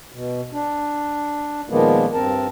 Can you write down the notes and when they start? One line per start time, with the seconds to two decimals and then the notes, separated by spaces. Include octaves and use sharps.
0.12 B2
0.53 D4
1.70 A#2 D#3 F3 G#3 A#3 B3
2.14 G2 C4 A#4 A5